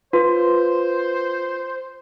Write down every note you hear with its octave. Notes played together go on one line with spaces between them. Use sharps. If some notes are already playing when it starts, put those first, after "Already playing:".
F4 B4 C5